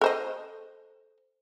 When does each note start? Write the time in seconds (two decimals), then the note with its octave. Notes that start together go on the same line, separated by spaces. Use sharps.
0.01 A4 C5 D#5